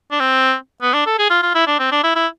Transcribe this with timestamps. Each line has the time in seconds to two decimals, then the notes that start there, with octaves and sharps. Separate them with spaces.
0.11 D4
0.20 C4
0.82 B3
0.93 D4
1.06 A4
1.19 G#4
1.30 F4
1.42 F4
1.55 E4
1.67 D4
1.79 C4
1.91 D4
2.03 E4
2.15 E4